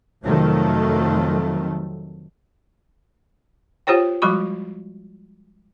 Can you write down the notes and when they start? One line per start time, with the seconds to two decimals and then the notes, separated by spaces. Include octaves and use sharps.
0.23 F2 C3 D#3 F#3 A3
3.87 F4 G4 C5 C#5 G5
4.22 F3 G3 G#3 F#4 B5 C#6